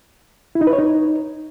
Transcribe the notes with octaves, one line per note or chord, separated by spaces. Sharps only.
E4
D#4
B4
C#5
D#4